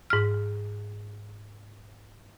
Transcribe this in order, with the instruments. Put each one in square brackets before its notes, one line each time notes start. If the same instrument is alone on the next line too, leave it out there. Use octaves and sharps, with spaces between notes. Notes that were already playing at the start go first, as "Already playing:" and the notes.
[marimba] G#2 F6